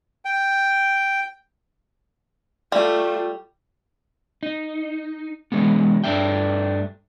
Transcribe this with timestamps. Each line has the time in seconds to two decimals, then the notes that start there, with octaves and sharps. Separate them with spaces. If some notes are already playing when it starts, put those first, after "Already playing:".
0.25 G5
2.72 G3 A3 F4
4.43 D#4
5.52 E3 F#3 G#3 B3
6.04 G2 E3 A3 D4 E5 G5